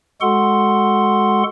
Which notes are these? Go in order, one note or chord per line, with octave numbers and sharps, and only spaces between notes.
G#3 F#4 A4 F#5 C6